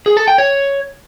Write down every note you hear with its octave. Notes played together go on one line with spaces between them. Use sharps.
G#4
A4
G5
C#5